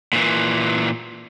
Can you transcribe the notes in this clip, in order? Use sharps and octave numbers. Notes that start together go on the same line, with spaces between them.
A#2 E3